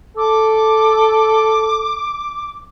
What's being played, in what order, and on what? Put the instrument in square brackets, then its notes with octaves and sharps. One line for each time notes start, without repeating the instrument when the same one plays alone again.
[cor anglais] A4 [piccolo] D6